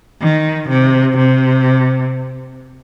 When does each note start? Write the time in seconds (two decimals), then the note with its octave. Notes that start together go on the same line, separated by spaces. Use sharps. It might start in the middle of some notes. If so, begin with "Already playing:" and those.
0.21 D#3
0.69 C3
1.17 C3